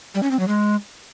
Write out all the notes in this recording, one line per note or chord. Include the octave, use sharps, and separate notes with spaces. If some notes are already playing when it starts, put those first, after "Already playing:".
G3
C#4
C4
F#3
G#3